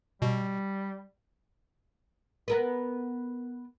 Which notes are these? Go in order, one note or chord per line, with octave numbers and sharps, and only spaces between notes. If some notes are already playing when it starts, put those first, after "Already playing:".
B2 G3
B3 A#4 B4